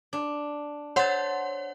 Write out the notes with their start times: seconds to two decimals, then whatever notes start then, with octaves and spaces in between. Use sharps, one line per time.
0.13 D4
0.96 C5 C#5 F#5 A5